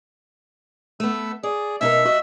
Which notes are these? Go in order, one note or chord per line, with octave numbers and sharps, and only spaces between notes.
A3 B3 E6
G#4 D5
B2 D#4 A#4 E5 E6
F#4 D#5 F#5